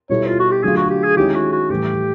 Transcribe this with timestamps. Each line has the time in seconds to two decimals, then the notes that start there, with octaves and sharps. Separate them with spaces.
0.09 B2 G3 B3 E4 A4 C#5
0.27 F4
0.39 F#4
0.51 G4
0.63 D3 F#3 A3 D4 F4 G#4
0.77 F#4
0.90 G4
1.03 G#4
1.17 D#3 G#3 C#4 E4 G4
1.35 F#4
1.52 F#4
1.70 A2 E3 G3 G4